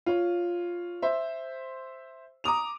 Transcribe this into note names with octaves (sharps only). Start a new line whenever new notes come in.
F4 C#5
C5 E5
A#5 D6 D#6 F7